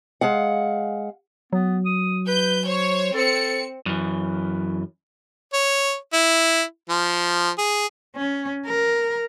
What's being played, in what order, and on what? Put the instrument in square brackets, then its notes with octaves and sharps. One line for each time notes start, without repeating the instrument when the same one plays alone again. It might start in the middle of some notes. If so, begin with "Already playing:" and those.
[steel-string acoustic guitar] G#3 F5 F#5
[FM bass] F#3 [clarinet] B3
[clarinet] D#6
[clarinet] B4 [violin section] G6
[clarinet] C5 [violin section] C#5
[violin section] C4 C#7 [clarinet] A4
[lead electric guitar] F#2 E3
[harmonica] C#5
E4
F3
G#4
[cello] C#4
A#4